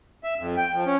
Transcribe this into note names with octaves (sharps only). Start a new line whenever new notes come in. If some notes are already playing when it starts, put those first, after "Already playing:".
E5
F2
G5
F3
C#4